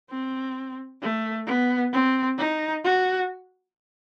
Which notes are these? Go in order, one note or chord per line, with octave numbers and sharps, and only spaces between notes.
C4
A3
B3
C4
D#4
F#4